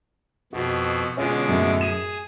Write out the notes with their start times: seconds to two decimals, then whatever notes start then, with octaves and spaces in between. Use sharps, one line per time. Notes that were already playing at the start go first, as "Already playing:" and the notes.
0.53 F2 B2 F#4
1.17 B2 D3 G#3 C#4 F4
1.48 F#2 A2
1.81 G#4 D#7 E7